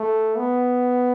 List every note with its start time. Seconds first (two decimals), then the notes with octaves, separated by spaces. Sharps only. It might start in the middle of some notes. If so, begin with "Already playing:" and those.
Already playing: A3
0.36 B3